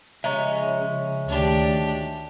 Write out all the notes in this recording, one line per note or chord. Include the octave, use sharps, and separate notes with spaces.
C#3 F3 G#3 C#4 E5 A#5
D2 D#3 D4 G4